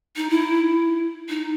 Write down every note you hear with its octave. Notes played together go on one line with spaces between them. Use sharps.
D#4
E4
D#4